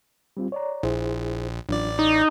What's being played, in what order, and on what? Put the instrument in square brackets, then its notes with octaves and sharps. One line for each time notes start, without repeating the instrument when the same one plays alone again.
[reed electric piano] G3 C4 F4
C#5 D5 A#5
[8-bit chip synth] A#1 [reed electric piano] E4 G#4 C5
[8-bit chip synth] A1 D5 [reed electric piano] F#3 D4 F4
[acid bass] D#4 [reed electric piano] D#6